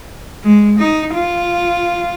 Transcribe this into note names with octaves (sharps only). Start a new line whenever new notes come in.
G#3
D#4
F4